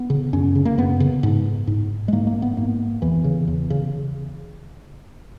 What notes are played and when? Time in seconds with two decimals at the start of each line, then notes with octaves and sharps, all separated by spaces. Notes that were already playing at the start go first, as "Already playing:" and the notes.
Already playing: B3
0.10 C#3
0.33 F#2 C#4
0.55 C#3
0.65 A#3
0.78 F#2 B3
1.00 C#3
1.23 G#2
1.67 G#2
2.08 G#3
2.13 G#2 A#3
2.27 A#3
2.42 B3
2.57 G#2 A#3
3.02 E2 E3
3.24 C#3
3.48 E2
3.70 C#3